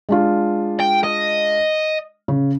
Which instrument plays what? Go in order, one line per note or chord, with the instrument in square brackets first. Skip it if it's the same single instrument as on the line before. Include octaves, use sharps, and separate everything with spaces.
[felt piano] G#3 D4 F4
[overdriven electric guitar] G5
D#5
[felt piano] C#3